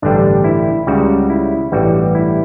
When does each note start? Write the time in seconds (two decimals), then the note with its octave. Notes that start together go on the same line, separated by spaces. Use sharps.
0.02 A1 G2 D3 G3 D4
0.44 E4
0.87 C#2 C#3 G3 F#4
1.30 E4
1.72 A1 G2 E3 G3 F#4
2.15 E4